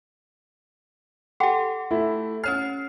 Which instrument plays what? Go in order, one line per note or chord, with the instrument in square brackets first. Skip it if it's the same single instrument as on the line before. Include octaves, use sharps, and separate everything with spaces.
[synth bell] G4 A4 [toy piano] F#5 G5 C6
[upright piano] A3 E4
[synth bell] C#4 C#5 C7 [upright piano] F6